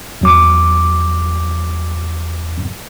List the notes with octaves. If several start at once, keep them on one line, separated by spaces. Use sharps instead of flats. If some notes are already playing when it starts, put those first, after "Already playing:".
E2 F#3 D6